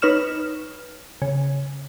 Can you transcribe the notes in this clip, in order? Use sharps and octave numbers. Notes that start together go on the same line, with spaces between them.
D#4 B4 C#5 F6 E7
C#3